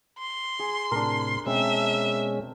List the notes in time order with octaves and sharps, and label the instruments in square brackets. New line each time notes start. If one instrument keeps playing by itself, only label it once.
[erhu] C6
[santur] G#4
[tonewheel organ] A2 C3 [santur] D4 A#4
[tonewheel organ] B2 G#3 C#4 [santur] C4 [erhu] E5